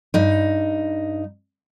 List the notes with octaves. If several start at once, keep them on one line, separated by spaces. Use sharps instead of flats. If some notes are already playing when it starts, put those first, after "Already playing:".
G2 D#4